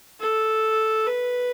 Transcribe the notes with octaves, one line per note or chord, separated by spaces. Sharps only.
A4
B4